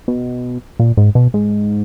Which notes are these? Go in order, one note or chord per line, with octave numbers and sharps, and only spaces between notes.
B2
A#2
G#2
B2
G#2